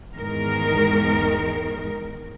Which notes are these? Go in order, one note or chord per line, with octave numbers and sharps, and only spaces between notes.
E2 G#2 D#3 G#3 A#4